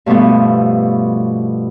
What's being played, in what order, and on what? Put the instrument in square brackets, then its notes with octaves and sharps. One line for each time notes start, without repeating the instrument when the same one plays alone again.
[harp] G2 B2 F3 A3 B3